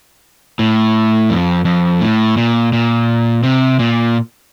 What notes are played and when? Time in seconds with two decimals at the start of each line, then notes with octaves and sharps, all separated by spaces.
0.59 A2
1.30 F2
1.65 F2
2.01 A2
2.37 A#2
2.73 A#2
3.43 C3
3.79 A#2